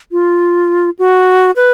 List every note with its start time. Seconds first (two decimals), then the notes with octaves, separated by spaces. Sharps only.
0.12 F4
0.99 F#4
1.56 B4